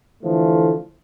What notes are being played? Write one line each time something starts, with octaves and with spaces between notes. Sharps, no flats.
D3 E3 F3 A3